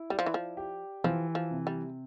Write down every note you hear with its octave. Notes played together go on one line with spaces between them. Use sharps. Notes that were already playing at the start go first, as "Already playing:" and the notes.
Already playing: E4
G3 D5
F3
E3
F3
G4
E3 F3
F3
C3
G3